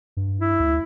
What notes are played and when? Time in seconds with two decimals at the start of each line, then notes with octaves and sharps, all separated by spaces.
0.17 G2
0.41 E4
0.60 D2